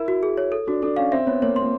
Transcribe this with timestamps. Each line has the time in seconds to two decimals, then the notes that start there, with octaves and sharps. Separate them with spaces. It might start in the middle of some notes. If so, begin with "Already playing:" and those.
Already playing: E4 A#4
0.08 F#4
0.23 G#4
0.37 C#5
0.52 A4
0.67 D4 F#4
0.82 D4 A4
0.96 C#4 F5
1.12 C4 E5
1.27 B3 C#5
1.42 A#3 C#5
1.56 C6
1.62 A#3